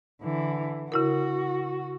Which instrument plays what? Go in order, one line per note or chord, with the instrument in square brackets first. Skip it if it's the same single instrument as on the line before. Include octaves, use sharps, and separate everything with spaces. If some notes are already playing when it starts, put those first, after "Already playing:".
[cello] D3 E3
[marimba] C#3 E4 A#4 [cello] F#4